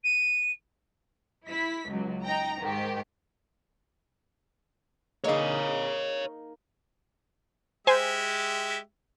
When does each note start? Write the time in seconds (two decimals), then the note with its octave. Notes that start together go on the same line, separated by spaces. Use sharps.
0.04 D#7
1.46 E4 B6
1.89 C#2 F#3
2.24 D#4 G5 A#5
2.61 G#2 D#3 G4
5.24 A#3 D#4 G#4 A#4 C#5 D#5 F5
7.87 G#3 G4 C5 E5 G#5